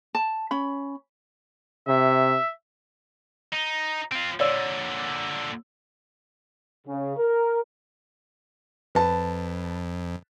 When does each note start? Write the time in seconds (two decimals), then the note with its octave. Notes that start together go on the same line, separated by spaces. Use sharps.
0.15 A5
0.51 C#4 B5
1.88 C3 E5
3.52 D#4
4.12 C4 F4
4.40 A#2 D3 C#5 D5 E6
6.87 C#3
7.17 A#4
8.95 F2 B4 A5